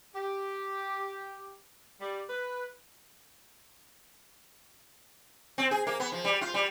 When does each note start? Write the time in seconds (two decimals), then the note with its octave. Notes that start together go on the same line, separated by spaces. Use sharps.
0.15 G4
2.00 G3
2.30 B4
5.58 C4
5.71 G#4
5.87 A#3
6.00 B3
6.12 F3
6.24 G3
6.41 F4
6.54 G3